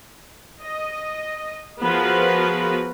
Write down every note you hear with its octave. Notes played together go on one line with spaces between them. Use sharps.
D#5
F3 B3 F#4 G#4 A#4 B4